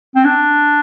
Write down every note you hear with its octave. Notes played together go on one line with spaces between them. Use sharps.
C4
D4